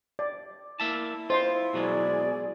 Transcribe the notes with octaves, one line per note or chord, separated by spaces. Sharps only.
D5
A#3 E4 E5 A5
F4 C5 D#5 C6
B2 F#3 G#3 G#4 D5